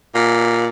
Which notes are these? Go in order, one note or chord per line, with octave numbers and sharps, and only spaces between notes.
A#2